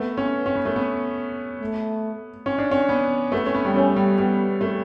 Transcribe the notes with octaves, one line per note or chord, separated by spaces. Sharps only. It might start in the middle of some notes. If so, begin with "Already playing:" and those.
Already playing: A3 B3
C#4
C#4
B3
A3
B3
A3
C#4
D4
C#4
B3
A3 B3
C#4
B3
G3
A3 C#4
G3
G3 B3
A3